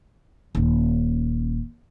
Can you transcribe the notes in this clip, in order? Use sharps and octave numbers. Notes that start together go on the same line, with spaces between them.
D#1 C#4